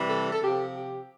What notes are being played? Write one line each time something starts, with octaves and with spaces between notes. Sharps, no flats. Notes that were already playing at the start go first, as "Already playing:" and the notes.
Already playing: C3 E3 G3
A4
A4
C3 F3 G4
G4